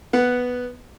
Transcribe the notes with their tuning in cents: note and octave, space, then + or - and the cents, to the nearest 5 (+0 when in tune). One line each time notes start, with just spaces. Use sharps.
B3 +0 F#5 +0